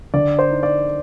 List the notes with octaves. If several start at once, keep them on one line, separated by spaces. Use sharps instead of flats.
D3 D5
C5
D#4
D5